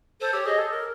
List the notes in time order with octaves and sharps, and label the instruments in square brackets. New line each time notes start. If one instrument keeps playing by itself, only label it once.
[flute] A4 [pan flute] C5
[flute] G4 [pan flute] C#5
[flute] G#4 [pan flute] D#5
[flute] A4
A#4